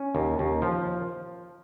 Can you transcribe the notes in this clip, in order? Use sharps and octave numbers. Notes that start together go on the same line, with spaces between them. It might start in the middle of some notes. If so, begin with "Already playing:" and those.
Already playing: C#4
D#2
D#2
F3